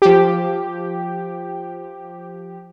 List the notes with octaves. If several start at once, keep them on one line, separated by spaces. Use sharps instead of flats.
F3 G4